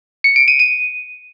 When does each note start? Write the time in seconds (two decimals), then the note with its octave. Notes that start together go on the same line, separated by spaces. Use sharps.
0.24 C#7
0.36 D7
0.48 D#7
0.59 D#7